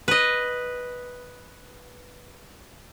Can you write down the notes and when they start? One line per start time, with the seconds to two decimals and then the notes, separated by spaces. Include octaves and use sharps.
0.08 B4 D#5